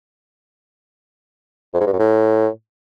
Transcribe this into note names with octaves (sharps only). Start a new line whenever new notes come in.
F2
G#2
G2
F#2
A2